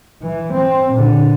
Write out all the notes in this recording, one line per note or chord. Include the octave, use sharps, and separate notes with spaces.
E3
C4
A#2 D3